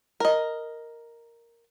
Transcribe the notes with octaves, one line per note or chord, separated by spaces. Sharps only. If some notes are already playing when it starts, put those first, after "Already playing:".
A#4 D#5